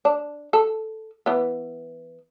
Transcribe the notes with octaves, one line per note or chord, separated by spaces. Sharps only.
D4
A4
E3 B3